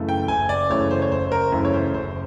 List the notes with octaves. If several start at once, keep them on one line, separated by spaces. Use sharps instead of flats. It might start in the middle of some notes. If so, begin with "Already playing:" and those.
Already playing: F#2 C#3 E3 A3
G5
F#1 G#5
D5
F#2 C#3 E3 A3 C#5
C5
C#5
F#1 C5
A#4
F#2 C#3 E3 A3
C#5
C5
F#1 C5